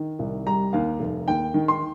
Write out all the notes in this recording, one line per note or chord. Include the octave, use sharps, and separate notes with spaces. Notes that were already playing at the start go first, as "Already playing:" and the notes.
Already playing: D#3
C2
G3 A#5
D#2 F5
F1
D#2 G5
D#3
C6